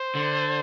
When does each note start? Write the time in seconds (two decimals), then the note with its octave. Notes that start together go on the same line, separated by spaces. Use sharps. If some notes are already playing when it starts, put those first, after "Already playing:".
Already playing: C5
0.15 D3